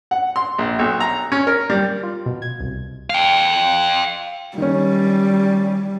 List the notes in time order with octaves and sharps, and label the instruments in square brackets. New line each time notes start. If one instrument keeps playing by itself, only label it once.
[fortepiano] F#5
C6
A#1
B1
A#5
C#4
A#4
G3
[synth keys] F4
B2
G#6
C2
[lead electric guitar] F5 G5
[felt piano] D#3 C#4 [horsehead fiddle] G3